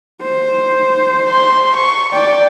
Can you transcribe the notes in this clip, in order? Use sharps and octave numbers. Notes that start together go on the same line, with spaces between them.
C5
C6
C#6
D5 G5